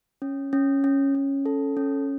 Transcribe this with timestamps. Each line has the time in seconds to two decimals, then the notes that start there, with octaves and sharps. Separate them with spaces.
0.22 C#4
0.53 C#4
0.84 C#4
1.15 C#4
1.46 A4
1.77 C#4